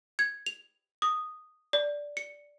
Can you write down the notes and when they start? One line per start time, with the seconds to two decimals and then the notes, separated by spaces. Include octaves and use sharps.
0.19 G#6
0.46 F7
1.02 D#6
1.73 D5
2.17 C#7